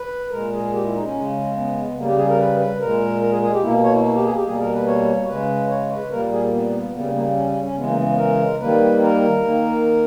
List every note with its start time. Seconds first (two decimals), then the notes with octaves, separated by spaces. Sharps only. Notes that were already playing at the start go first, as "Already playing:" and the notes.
Already playing: B4
0.31 A#2 G#3 A#4
0.53 G#4
0.74 G4
0.84 E4
0.94 D#4
1.03 C#4
1.15 C#3 G#3
1.56 B3
1.97 C#3 G3 A#3
2.07 G4
2.17 G#4
2.29 A#4
2.39 B4
2.60 B4
2.80 A#2 G#3 A#4
3.21 A#4
3.31 G#4
3.42 G#4
3.53 G4
3.63 B2 A#3 E4
3.84 C#5
3.94 E4
4.04 E4
4.15 G4
4.25 G#4
4.35 G4
4.46 B2 G3 A#3 G#4
4.59 A#4
4.73 B4
4.87 C#5
5.28 C#3 G#3 B4
5.70 C#5
5.90 B4
6.11 A#2 G3 A#3 A#4
6.33 G#4
6.53 B3
6.94 C#3 G3 A#3 B3
7.04 A#3
7.14 A#3
7.36 C#4
7.49 C#4
7.63 C#4
7.76 C#3 E3 G#3 B3
7.87 A#3
7.98 B3
8.09 B3
8.18 A#4
8.60 D#3 G3 A#3 B4
9.02 A#4
9.43 D#3 A#3